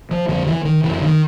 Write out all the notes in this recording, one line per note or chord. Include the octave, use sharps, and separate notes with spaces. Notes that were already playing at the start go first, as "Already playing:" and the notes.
F3
F2 D3 F3
E3
D#3
F#2 C#3 E3
D#3